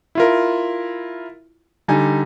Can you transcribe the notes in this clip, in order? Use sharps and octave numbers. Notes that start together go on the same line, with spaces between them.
E4 F4 A#4
D3 G3 D#4 G#5